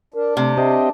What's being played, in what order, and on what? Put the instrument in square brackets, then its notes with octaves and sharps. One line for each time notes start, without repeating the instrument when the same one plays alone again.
[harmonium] D4 [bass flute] A#4
[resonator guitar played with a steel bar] C3 [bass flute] A3
[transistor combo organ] C4 G4 D#5 [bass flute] E5